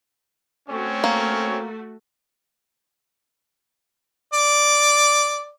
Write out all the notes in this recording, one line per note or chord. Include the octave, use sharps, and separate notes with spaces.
A3 C4 C#4 F#4 C#5
A#3
D5